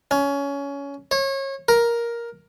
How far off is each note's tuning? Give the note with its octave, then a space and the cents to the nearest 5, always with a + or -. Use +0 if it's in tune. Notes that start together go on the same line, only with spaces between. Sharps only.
C#4 +20
C#5 -30
A#4 +10